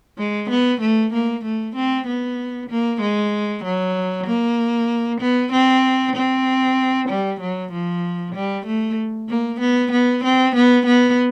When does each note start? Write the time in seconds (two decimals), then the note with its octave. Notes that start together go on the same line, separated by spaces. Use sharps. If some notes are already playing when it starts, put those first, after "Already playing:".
0.18 G#3
0.50 B3
0.81 A3
1.13 A#3
1.45 A3
1.76 C4
2.07 B3
2.70 A#3
3.01 G#3
3.64 F#3
4.27 A#3
5.21 B3
5.52 C4
6.16 C4
7.09 G3
7.41 F#3
7.72 F3
8.35 G3
8.66 A3
9.29 A#3
9.60 B3
9.92 B3
10.24 C4
10.56 B3
10.86 B3